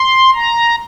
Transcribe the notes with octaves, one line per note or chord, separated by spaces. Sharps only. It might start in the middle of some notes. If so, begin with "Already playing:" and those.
Already playing: C6
A#5